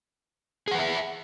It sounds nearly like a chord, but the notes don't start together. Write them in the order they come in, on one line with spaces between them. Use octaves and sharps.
G#4 F#5 B4 E5